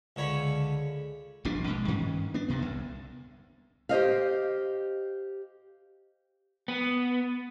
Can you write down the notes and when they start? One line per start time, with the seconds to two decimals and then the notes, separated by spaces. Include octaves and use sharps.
0.16 C#2 D3 C#5 B5
1.45 D#1 A#1 B2 D4
1.67 B2 G#3
1.88 G2 D#3 C#4
2.34 B3 D4
2.48 D1 G2 C3 B3
2.62 C2
3.89 G4 C5 D#5 F5
6.68 B3